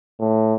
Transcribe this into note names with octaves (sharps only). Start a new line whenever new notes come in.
A2